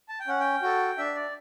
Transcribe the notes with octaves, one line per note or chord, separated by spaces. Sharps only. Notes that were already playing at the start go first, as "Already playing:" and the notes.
A5
G5
C#4 F#5
G5
F#4 A4
D4 E5
D5